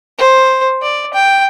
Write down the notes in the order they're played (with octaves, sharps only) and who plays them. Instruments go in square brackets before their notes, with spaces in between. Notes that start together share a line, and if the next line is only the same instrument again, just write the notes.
[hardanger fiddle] C5
D5
G5